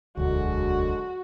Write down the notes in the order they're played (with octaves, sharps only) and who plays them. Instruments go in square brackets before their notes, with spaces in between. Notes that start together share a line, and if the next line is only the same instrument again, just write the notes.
[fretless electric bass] E1 D2 [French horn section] D3 F#3 G#3 [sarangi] F#4